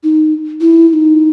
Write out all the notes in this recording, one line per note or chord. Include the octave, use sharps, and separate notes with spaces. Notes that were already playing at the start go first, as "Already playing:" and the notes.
D#4
E4
E4
D#4